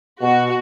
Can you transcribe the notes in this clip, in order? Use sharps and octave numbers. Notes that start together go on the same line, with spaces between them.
B2 F#4